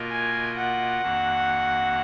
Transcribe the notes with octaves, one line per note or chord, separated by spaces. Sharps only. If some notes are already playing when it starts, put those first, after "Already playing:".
Already playing: B2 A#3 F4 A#4 D#5
G#5
F#5
F2 D#3 A#3 D4 F#4